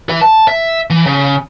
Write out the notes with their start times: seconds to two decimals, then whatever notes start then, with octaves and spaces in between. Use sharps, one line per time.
0.09 B4 E5
0.21 A5
0.48 E5
0.90 E3
1.06 C#3